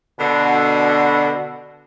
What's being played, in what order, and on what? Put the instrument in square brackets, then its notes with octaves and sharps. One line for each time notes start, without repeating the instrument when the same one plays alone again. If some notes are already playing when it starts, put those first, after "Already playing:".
[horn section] B2 D3